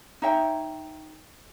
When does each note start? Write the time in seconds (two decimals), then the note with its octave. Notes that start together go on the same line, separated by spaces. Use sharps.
0.22 D#4 C#5 E5 G5